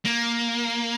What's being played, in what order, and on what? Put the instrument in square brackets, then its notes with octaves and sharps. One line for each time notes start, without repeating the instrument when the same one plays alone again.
[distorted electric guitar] A#3